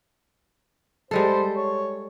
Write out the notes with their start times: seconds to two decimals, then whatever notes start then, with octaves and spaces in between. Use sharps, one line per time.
1.11 G3 G#3 A4 C5
1.56 C#5